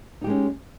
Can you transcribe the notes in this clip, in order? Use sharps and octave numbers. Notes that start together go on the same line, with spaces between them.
G#3 C#4 D#4 G4